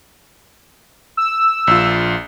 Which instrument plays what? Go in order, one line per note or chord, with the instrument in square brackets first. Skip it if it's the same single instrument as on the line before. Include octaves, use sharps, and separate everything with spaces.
[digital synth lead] E6
[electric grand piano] A#1 F4